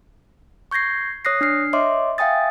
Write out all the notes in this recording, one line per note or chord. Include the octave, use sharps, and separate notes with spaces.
C#6 G6 G#6 A#6 C7
C#5 D#6 F#6 A#6 C7
D4 F6 C7
C#5 D#5 E5 C6 D6
E5 F5 G5 G#5 D#6 A6